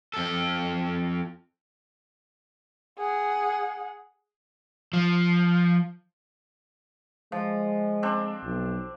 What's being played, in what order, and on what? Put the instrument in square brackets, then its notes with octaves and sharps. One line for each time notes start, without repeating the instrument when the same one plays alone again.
[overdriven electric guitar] F2 A4
[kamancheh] G#4 F#5
[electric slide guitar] F3
[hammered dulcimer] F3 [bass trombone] G#3
[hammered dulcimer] C4 D4
[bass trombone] B1